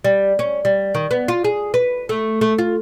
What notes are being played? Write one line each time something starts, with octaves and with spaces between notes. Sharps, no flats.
G3
C#4
G3
D#3
B3
F4
G#4
B4
A3
A3
F4